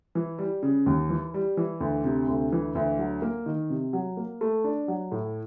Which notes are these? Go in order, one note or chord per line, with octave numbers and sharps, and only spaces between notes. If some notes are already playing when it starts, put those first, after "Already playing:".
E3
G3
C#3
D#2
E3
G3
E3
D2
C3
D2
E3
D2
F#3
A#3
D#3
C3
F#3
A#3
A3
D4
F#3
A2